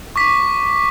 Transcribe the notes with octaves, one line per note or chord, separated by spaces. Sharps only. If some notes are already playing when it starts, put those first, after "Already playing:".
C#6 D6 B6